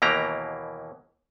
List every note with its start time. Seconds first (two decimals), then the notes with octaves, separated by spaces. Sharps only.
0.02 D#2 B2 E3 A#3 G4 A#5